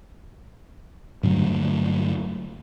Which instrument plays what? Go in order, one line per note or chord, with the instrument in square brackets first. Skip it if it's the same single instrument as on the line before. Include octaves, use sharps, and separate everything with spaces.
[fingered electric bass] G2 D3 F#3 A3